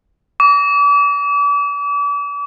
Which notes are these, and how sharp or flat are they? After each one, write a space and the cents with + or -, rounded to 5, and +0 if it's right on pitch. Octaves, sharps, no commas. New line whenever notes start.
D6 -40